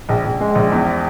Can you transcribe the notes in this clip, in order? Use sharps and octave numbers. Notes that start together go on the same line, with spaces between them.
A#1
A#1
G#3
A#1
E2